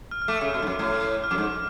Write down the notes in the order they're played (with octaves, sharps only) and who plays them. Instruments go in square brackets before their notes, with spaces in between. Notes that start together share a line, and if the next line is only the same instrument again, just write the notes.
[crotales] F6
F6
[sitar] A3 [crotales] D6
[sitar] C#3
[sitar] B2 [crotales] F6
[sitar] G#2
F#2
A2
[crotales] F6
[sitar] F#2 [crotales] D6
[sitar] G#2